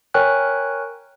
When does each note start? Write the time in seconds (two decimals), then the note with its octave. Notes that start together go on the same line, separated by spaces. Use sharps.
0.14 A#4 C#5 G5 G#5 C#6 F#6